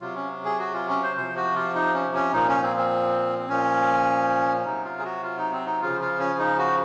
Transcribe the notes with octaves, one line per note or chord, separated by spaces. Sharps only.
C3 F#3 F4
C#4
G#4
F#4
F4
C#4
C5
C3 F3 C5
F#4
F4
D#4
C#4
C#4
A#2 F3 D#4
C#4
C4
C4
C4
A#2 F3 C#4
C3 F#3 D#4
F4
G#4
F#4
F4
D#4
C4
D#4
C#3 F3 F4
F4
C#4
D#4
F#4